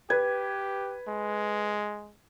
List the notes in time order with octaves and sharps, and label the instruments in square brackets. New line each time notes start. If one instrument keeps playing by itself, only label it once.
[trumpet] G4 [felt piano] B4 G#6
[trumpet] G#3